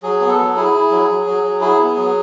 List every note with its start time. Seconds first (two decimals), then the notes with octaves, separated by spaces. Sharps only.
0.03 F#3 G#4
0.21 B3
0.29 A4
0.39 F#3
0.56 E4 G#4
0.73 E4
0.91 F#3
1.08 F#3
1.26 F#3
1.44 F#3
1.61 E4 G#4
1.78 B3
1.96 F#3